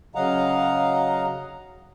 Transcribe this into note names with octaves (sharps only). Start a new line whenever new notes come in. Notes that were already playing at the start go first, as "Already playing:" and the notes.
C#3 F#3 D#5 F5 F#5 A#5